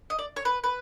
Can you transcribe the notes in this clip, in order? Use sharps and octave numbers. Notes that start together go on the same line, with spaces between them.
D#5
D5
C#5
B4
B4